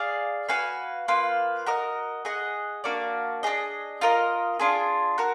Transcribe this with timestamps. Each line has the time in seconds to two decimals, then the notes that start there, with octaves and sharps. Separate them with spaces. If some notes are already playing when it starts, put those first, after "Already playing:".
Already playing: G#4 D5 F5
0.49 F#4 B4 F5 G#5
1.08 A#3 F4 B4
1.66 F#4 A#4 D#5
2.25 G#4 D#5 F#5
2.84 A#3 D4 F#4 D5
3.43 D4 G#4 D#5
4.01 F4 A#4 D#5
4.60 D4 F4 G#4
5.18 F#4 A#4